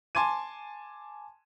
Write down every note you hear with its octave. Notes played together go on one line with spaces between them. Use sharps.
G#5 A5 C6 D6 G#6 D#7